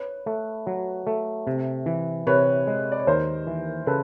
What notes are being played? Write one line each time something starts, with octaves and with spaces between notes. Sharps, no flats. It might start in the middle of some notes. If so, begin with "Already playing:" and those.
Already playing: B4 C#5
A3
F#3
A3
C3
E3
C3 B4 C#5
G#3
D5
C#5
D#2 A#4 C5
E3
C#3 A4 B4